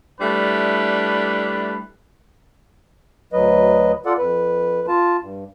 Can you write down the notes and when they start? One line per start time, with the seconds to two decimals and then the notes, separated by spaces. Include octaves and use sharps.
0.20 G3 A3 D4 E4 B4
3.33 D2 F#3 B4 D#5
4.06 F4 A4 D5 F#5
4.18 F2 B4
4.88 F4 A5
5.21 G2